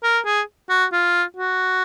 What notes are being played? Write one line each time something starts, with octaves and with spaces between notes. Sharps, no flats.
A#4
G#4
F#4
F4
F#4